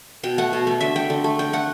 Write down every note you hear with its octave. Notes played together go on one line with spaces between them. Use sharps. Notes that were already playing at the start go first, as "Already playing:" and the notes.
B2 G5
A3 F#5
B2
A3
D3 E5
A3 G5
D3
A3
D3 G5
A3 F#5